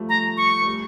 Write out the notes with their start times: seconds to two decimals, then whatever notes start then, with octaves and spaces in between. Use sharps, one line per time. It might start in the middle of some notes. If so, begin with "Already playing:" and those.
Already playing: F3 G3 A3
0.09 A#5
0.37 C#6
0.62 A3
0.66 G3